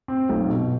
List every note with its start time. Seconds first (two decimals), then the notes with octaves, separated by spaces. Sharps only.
0.08 C4
0.29 B1
0.50 B2